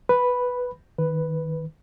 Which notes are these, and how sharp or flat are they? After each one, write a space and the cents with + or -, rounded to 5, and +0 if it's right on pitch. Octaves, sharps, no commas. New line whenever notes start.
B4 +0 B5 +0
D#3 +10 B4 +0